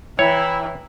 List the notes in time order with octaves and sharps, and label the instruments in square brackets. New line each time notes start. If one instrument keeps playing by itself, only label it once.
[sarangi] E3 [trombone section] E4 [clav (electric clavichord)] C#5 [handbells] G5 A#5